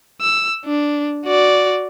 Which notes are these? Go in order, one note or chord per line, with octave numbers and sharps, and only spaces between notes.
E6
D4
F#4 D5